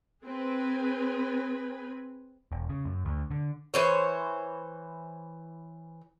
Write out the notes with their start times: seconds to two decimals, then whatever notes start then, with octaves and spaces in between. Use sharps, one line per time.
0.23 C4 G#4 B4 G#5
2.52 E1
2.69 C#3
2.85 F#2
3.05 D2
3.31 D3
3.74 E3 C5 C#5